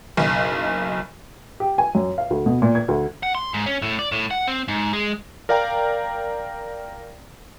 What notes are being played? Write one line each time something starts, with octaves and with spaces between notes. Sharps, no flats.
F#1 B1
G4
G#5
F#2
F5
D2
B2
A#2
G#6
D2
F#5
C6
G#2
C#4
A2
D5
A2
F#5
C4
G#2
G#3
A#4 D5 F5 G5 A#5